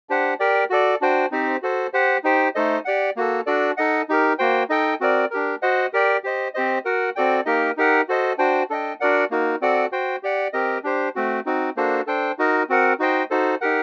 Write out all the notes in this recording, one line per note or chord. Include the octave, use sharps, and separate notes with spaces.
D4 G4 C5 F#5
G4 A#4 D5 G5
F#4 A4 D5
D4 F#4 C5 G5
C4 D#4 G4 C5
F#4 A4 C5
G4 C5 F#5
D#4 G4 C5 G5
A3 D#4 A4 C5 D#5
G4 D5 F#5
A#3 F#4 A4
D4 F#4 A4 D5
D#4 A4 D#5 F#5
D#4 G4 A#4
A#3 F#4 C5 G5
D#4 A4 D#5 G5
C4 F#4 A#4 D5
D4 G4 A#4
F#4 C5 D#5 F#5
G4 A#4 D5 G5
G4 C5 D#5
C4 G4 C5 D#5
F#4 A#4 F#5
C4 F#4 A4 D5 G5
A#3 D#4 G4 A#4 D#5
D#4 G4 A#4 F#5
F#4 A4 C5 D#5
D4 F#4 C5 G5
D4 A4 D#5 G5
D4 F#4 A#4 D5 F#5
A#3 D#4 F#4 A#4
C4 F#4 A4 D5 F#5
F#4 C5 G5
G4 D5 F#5
C4 G4 A#4 D#5
D4 G4 C5
A3 C4 F#4
C4 D#4 F#4
A#3 D4 F#4 A4 C5
D4 A4 C5 G5
D#4 F#4 A#4 D#5
C4 F#4 A#4 F#5
D#4 F#4 C5 D#5 G5
D#4 F#4 A4 C5
D#4 G4 A#4 F#5